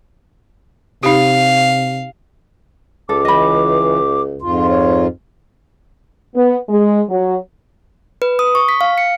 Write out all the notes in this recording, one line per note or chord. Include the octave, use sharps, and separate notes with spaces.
C3 D#4 G4 F5
C#2 A4 D6
E3 D#5 B5
F2 G#2 F4 C6
C#5
B3
G#3
F#3
B4
D#6
C#6
B6
F5
C#7